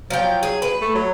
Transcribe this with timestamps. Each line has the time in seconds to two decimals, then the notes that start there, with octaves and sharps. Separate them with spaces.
0.10 F3 F#3 G5
0.43 G#4
0.62 B4
0.81 A3
0.95 F#3